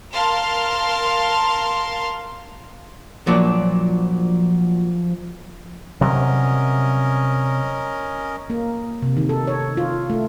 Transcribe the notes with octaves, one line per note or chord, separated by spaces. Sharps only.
A#4 F5 A5 C6 F6
A#2 F3 F#3 D4
C3 F#3 G3 C#4 A#4 D#5
A#3
C3
D#3
A4
C#5
F4
A3